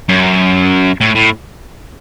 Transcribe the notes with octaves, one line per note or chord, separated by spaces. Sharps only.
F#2
A2
A2